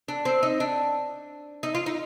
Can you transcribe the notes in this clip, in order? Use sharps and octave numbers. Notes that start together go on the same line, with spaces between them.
D4
C4
D#4
D4
D#4
F4
D#4